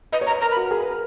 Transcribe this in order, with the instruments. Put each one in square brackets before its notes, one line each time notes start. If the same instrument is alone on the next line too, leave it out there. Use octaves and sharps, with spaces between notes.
[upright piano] B4 [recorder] D#5
[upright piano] C#5
[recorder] A#5
[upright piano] B4
[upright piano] A#4 [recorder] A#5
[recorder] B5
[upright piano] F#4
A#4
G#4
B4
A#4